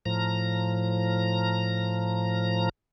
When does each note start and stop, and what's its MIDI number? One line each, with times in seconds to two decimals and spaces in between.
0.06 2.69 45
0.06 2.69 53
0.06 2.69 82